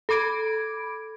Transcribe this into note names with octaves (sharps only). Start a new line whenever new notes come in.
A4 B5 D6 G#6 D7